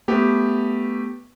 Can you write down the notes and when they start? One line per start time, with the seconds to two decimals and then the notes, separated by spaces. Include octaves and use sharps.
0.08 A3 B3 G4